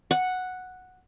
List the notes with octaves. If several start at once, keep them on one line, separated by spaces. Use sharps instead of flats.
F#5